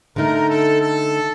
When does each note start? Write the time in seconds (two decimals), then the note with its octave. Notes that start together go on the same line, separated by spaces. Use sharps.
0.16 D3 A3 D#4 A#4
0.49 A4
0.81 A4